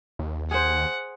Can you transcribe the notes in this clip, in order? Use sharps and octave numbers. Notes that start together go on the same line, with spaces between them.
D#2
G#4 C5 F#5